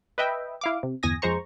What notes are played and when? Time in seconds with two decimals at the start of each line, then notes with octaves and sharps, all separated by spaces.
0.18 B4 D#5 E5 G5
0.61 E4 F5 D6
0.83 C3
1.03 G1 E2 G#5 D#6 A#6
1.22 F2 G#3 C5 A#5 C#6